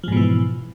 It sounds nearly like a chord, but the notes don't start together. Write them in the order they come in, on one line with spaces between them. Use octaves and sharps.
F3 G#2 B2 E3